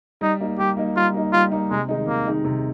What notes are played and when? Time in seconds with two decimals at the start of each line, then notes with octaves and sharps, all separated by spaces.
0.21 G3 D#4
0.40 A#3 D#4
0.59 G3 G4
0.77 A#3 D#4
0.96 G3 F4
1.14 A#3 D#4
1.33 G3 F4
1.52 A#3 D#4
1.71 C3 G#3
1.89 D#3 G#3 D#4
2.07 C3 A#3
2.26 D#3 G#3 D#4
2.45 C3